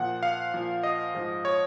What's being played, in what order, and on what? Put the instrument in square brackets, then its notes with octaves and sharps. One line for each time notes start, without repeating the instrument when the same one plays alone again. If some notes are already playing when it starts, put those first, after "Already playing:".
Already playing: [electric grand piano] A#2 F3 F#5
F5
A#2 F3
D#5
G#2 F3
C#5